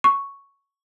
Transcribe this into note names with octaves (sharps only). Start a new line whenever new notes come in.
C#6